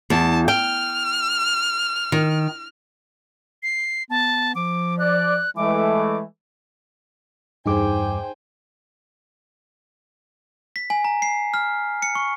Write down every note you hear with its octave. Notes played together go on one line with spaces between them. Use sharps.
E2 A5
G5 F6
D#3
C7
B3 A5
F3 D6
D5 F#6
E3 G#3 A3 D6
E2 G2 D#4 G#4 C5 G5 G#5 D6
B6
G#5
A#5
C7
F6
C#7
C#6